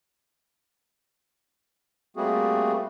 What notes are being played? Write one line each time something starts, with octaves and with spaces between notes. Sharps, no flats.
G3 A3 A#3 C4 F#4 G#4